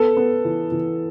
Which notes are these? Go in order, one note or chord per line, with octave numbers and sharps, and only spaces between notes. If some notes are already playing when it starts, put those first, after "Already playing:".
Already playing: B3 A4
B3
E3
E3